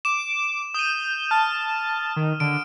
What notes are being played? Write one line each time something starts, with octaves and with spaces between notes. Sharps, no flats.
D6 E7
D#6 G6 D#7
A5 F6
D#3
D3 D7